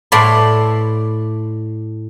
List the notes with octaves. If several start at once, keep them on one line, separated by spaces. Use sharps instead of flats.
A2 E4 D5 B5 C6